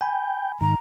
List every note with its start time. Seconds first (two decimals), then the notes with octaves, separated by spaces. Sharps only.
0.01 G5 G#5 B5
0.61 G#2 D#3 A#5